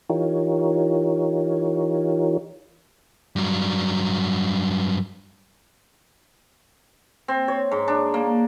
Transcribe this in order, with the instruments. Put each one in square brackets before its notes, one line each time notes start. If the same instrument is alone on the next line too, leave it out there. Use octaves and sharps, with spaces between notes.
[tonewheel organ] E3 D#4 F4 G4 A#4 C#5
[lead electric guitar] G2 F#3
[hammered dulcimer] C4
C#5
G#2
D4
A#3